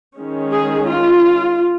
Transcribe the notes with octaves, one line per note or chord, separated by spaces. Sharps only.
D#3 G#3 C#4
G#4
F4